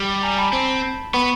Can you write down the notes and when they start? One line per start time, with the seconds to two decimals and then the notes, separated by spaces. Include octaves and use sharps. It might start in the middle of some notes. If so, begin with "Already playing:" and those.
Already playing: G3
0.23 G#5 A#5
0.38 A5 B5
0.53 C4
1.14 B3 B5 C#6